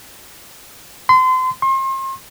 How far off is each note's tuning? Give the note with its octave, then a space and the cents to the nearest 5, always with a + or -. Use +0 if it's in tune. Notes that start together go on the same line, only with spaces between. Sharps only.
C6 -30
C6 +40